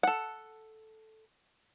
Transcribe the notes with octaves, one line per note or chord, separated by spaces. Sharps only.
A4 F#5